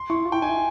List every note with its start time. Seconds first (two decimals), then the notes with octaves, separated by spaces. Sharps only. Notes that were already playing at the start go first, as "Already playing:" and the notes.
Already playing: C6
0.10 E4 C#6
0.25 F4
0.32 E4 G5
0.42 D#4 G#5
0.50 E4